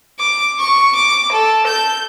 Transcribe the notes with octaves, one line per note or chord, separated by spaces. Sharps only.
D6
C#6
D6
A4
G6